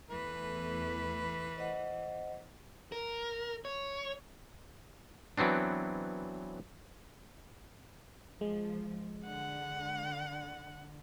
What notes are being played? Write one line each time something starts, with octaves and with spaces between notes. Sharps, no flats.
E2 E3 A3 B4
C5 D#5 F#5
A#4
C#5
E3 F#3 B3 C4 D4
F3 G#3
D3 F#5